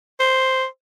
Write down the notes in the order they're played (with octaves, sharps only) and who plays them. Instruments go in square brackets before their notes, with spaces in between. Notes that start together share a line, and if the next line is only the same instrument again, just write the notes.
[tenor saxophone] C5